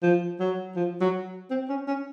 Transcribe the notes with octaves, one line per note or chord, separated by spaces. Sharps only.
F3
F#3
F3
F#3
C4
C#4
C#4